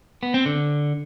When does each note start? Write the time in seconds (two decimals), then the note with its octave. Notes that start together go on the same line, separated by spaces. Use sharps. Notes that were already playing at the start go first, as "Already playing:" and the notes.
0.23 B3
0.34 C4
0.46 D3